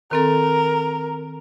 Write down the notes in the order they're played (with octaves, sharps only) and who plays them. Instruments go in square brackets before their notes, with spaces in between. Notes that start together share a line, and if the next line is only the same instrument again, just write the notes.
[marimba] D#3 C4 A4 [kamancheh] A#4